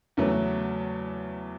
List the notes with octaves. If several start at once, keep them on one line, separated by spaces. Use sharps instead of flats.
E2 C#3 F#3 A3 C#4